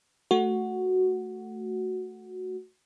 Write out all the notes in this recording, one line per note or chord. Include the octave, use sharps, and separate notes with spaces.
A3 F#4